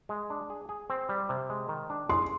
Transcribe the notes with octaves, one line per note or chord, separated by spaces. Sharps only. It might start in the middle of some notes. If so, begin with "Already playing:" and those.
G#3
D4
G#4
G#4
C4
G3
C3
G#3
D#3
D4
G#4 C6